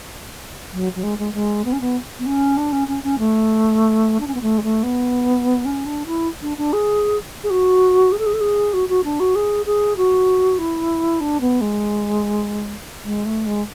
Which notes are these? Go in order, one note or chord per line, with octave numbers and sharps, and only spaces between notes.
F#3
F#3
G#3
G#3
G#3
B3
C#4
B3
B3
C#4
D4
C#4
C#4
C#4
A3
D4
C#4
B3
A3
G#3
A3
B3
C#4
D4
E4
D4
D4
G#4
G#4
F#4
G#4
A4
G#4
A4
G#4
F#4
F#4
D4
F#4
G#4
G#4
F#4
E4
D4
B3
G#3
G#3
A3
G#3